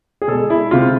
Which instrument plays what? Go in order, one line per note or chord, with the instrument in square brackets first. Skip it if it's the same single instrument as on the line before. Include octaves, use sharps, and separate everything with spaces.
[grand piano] G#4
B2 G#3 A4
E4
C3 G#3 F4